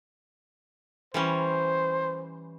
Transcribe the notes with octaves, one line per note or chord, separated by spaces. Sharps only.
E3 G3 C#4 C5